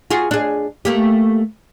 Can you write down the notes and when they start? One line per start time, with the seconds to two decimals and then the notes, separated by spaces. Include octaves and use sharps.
0.10 F4 F#4 G#4
0.31 D4 G#4
0.85 A3 A#3 G4